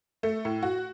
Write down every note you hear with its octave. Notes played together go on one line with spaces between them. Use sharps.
A3
A2
F#4